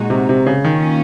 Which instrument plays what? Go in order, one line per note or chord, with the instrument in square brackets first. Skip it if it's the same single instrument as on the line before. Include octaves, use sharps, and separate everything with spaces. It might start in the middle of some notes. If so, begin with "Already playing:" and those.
Already playing: [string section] A#2 G#3 D#4 F#4
[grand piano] C3
C3
C#3
[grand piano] D#3 [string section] A#3 C#4 F4